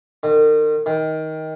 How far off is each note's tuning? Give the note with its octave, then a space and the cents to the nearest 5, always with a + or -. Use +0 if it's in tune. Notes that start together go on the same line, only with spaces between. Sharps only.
D#3 -40
D#3 +20